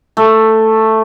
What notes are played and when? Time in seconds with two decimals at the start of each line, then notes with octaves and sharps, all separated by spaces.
0.17 A3